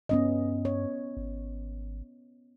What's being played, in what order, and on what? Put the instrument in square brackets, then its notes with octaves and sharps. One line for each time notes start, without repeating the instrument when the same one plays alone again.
[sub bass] G2 [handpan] B3 C#4 D#5
[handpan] C#5
[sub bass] G#1